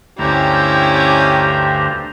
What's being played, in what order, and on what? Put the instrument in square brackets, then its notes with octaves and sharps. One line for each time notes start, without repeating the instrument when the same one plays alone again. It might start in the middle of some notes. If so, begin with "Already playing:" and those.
[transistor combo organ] D2 [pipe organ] G2 C5 A#5 [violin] C#4 E4 [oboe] G4